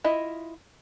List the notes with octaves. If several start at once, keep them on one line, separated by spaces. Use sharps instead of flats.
E4 F4 D#5 E5